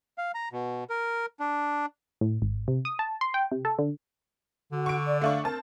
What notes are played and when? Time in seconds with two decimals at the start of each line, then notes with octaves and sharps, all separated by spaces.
0.18 F5
0.34 A#5
0.52 B2
0.90 A#4
1.40 D4
2.21 A2
2.42 G#1
2.68 C3
2.85 D#6
2.99 A5
3.21 C6
3.34 G5
3.52 C3
3.65 A4
3.79 D3
4.72 D3 F#4
4.86 C#6 D7
5.07 D5
5.22 A3 D4 F5 C#6
5.44 C4 A#4 A5